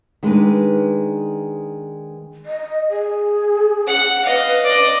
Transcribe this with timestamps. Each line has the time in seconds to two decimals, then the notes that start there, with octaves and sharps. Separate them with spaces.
0.23 D#3 G#3 D4 B4
2.46 D#5
2.90 G#4
3.87 F#5
4.24 B4 D#5 F5
4.64 D5 D#5